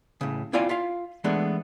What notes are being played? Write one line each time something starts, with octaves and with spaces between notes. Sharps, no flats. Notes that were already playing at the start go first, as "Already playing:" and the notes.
A2 C#3
C4 E4 F4 D5 F5 G#5
F4 E5 F5
E3 G#3 A3 B3 D4